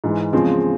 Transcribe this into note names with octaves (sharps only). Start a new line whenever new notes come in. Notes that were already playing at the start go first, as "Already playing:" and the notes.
G#2 E3 G#3
E2 C#3 F3 G#3 C4